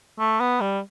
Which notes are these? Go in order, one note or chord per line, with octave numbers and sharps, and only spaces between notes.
A3
B3
G3